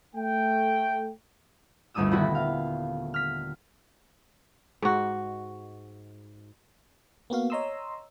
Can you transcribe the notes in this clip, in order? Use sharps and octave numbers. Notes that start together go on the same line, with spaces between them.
A3 G5
G1 D2 A3 D4 D#6 E6
D#1 D3 B3 E4 F#4 B6
F5
F6 B6
G#2 F#4
A#3 B3 F#4 F5
C#5 D#5 A#5 C6 D#6 E6